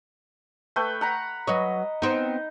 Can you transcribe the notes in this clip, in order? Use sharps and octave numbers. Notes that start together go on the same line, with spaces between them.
A3 B4 G5
F#5 A#5 B5
F#3 B4 C#5 D#5
B3 C4 D#4